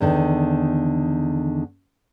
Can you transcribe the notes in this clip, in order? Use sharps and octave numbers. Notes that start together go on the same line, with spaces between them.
E2 D3 D#3